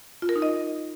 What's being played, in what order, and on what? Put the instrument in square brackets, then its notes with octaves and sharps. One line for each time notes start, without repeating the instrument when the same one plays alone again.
[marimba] F4
A#4
D#4
D#5